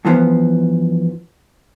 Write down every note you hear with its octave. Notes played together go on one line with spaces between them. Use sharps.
G2 E3 F3 B3